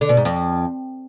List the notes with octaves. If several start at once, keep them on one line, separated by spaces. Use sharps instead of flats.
D3
B2
G#2
F2